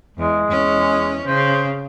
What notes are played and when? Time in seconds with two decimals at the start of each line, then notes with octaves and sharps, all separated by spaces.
0.17 E2 G#3
0.48 E2 C#4
1.25 C#3 C5